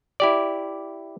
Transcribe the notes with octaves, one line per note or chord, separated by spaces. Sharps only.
E4 G4 D5